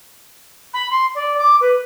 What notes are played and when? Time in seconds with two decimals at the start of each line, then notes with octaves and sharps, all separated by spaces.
0.73 B5
0.90 C6
1.14 D5
1.37 D6
1.60 B4